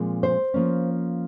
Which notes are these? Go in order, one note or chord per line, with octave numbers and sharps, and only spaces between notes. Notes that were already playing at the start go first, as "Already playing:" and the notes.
Already playing: A#2 F3 G#3 C4
C5
F3 A#3 C#4